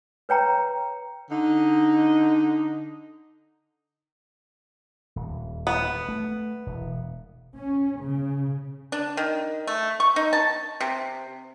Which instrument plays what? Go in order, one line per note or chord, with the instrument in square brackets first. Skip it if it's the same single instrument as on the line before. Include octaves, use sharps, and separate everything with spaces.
[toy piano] B4 C#5 G5 A#5
[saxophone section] D3 D#4
[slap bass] D#1
[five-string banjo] B3
[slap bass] A3
E1
[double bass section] C#4
C#3
[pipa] D4
D#3
A3
C#6
D#4
A5
C3